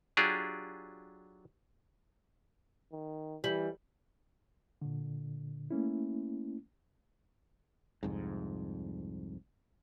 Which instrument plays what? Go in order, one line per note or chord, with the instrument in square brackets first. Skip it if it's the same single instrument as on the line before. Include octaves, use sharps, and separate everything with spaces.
[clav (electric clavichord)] F#3 D4 F4 G4 G#4
[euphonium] D#3
[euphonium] E3 [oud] G3
[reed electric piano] A#2 D3
A3 A#3 C#4 E4
[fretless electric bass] C2 F2 G#2